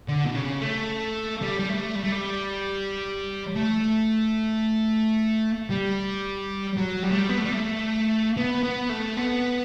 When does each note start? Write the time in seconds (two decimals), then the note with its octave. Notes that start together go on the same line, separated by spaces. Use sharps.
0.08 D3
0.26 B2
0.35 C#3
0.61 A3
1.42 G3
1.59 G3
1.69 A3
1.95 G3
2.03 A3
2.12 G3
3.56 A3
5.70 G3
6.77 F#3
7.03 G3
7.10 A3
7.18 G3
7.29 B3
7.38 A3
7.45 G3
7.53 A3
8.37 B3
8.63 B3
8.90 A3
9.17 B3